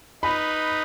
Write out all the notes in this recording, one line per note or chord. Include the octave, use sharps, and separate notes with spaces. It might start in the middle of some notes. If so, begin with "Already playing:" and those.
D#4 B4 B5